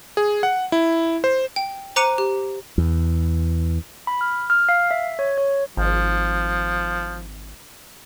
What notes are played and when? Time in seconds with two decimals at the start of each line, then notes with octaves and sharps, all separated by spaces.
0.17 G#4
0.43 F#5
0.72 E4
1.24 C5
1.56 G5
1.96 C5 A#5 D6 F#6 C#7 D#7
2.18 G4
2.78 E2
4.07 B5
4.21 F6
4.50 F6
4.69 F5
4.91 E5
5.19 C#5
5.38 C#5
5.77 G#1 F3